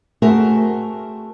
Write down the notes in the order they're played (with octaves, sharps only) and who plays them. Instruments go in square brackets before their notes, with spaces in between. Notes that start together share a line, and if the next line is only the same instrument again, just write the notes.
[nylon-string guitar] A3 C4 F#4 G#4 A#4 E5